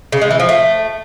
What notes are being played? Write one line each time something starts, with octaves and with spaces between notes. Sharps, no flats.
C#3
G#3
E3
F3
A3